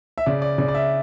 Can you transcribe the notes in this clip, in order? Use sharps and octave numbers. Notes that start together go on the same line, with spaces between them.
E5
C#3 D5
D5
C#3 D5
D5
E5